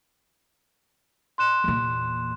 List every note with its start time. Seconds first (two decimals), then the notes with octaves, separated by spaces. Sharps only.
1.38 C6 F#6 E7
1.64 E2 A#2